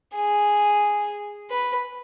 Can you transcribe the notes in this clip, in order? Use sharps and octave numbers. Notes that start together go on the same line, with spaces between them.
G#4
B4